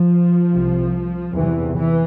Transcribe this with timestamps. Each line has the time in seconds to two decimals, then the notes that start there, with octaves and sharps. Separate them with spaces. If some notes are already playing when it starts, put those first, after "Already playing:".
Already playing: F3
0.53 C2 C3
1.34 E2 C3 E3
1.75 E3